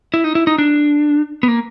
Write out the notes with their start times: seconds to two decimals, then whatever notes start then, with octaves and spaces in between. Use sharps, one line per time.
0.14 E4
0.24 D#4
0.35 E4
0.47 D#4
0.58 D4
1.43 B3
1.48 A#3